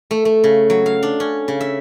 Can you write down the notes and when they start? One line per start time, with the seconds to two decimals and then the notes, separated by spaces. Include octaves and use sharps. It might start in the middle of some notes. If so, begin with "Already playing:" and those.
0.11 A3
0.25 A3
0.44 C#3
0.70 F#3
0.86 F5
1.03 D4
1.20 C#4
1.48 C#3
1.61 E5